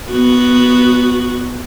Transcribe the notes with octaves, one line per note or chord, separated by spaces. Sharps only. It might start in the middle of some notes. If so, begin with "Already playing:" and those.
B3 F#4